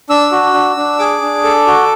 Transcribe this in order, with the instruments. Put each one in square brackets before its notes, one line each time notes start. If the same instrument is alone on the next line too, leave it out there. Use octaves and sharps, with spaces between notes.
[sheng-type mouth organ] D4 E6
F#4
D4
D4
G#4 D6
D4
A4
F#4